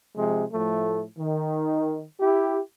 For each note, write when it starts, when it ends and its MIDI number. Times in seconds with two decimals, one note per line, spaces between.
0.16 0.44 48
0.16 0.44 53
0.16 0.44 56
0.53 1.04 45
0.53 1.04 53
0.53 1.04 57
1.17 2.03 51
2.19 2.59 64
2.19 2.59 67